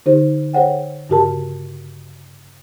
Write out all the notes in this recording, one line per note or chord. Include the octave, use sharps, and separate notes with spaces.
D3 D#4 G4 C5
G#4 C5 C#5 F#5 G5
G2 C#3 F#4 G4 A#4 A5